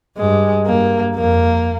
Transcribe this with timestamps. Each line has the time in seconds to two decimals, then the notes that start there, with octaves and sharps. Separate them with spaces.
0.17 G2 G#3
0.66 G2 A#3
1.16 F2 A#3